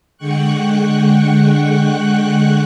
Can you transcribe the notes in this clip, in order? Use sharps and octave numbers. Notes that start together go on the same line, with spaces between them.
D3 G#3 F#5 G5 C#6 F#6